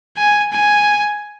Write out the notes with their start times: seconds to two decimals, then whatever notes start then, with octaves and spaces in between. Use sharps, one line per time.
0.17 G#5
0.52 G#5